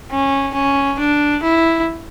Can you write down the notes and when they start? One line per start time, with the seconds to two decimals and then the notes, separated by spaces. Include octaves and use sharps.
0.11 C#4
0.54 C#4
0.99 D4
1.43 E4